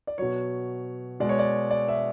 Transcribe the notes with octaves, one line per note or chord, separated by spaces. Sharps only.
D5
B2 F#3 C#5
B2 G#3 D5
C#5
D5
D5
E5